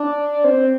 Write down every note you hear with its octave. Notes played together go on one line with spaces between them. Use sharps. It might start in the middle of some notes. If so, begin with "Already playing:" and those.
Already playing: D4
C4